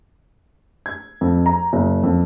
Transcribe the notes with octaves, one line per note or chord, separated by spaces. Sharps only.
G#6
F2
A#5
F#1
F2